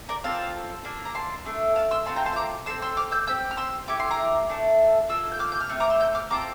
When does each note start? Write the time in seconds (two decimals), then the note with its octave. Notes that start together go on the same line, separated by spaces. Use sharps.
0.09 A#4 D5
0.24 C4 F4 A4 F5 A5
0.85 A#3 D4 A4
1.05 A#5
1.15 A5 C6
1.45 A3 D4 A4
1.76 F5 A5
1.91 C6 E6
2.06 A3 C4 F4 A5 C6
2.16 G5 A#5
2.26 A5 C6
2.33 E6
2.36 A#5 D6
2.66 C4 F4 A4 C6 E6
2.82 C6 E6
2.97 D6 F6
3.12 E6 G6
3.27 C4 G4 E6 G6
3.51 F6
3.57 C6 E6
3.88 A3 E4 G4 D6
3.99 C6
4.11 A#5 D6
4.49 A3 D4 A4
5.09 A#3 F4 A4 E6
5.32 G6
5.39 D6 F6
5.52 G6
5.60 F6
5.69 A3 C4
5.80 A#5 D6
5.90 C6 E6
6.00 E6 G6
6.15 D6 F6
6.30 C4 F4 A4 A#5 D6